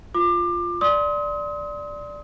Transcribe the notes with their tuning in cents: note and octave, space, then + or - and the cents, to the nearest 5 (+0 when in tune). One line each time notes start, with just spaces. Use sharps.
F4 +0 D6 +25
D5 +0 C6 +0 D#6 +40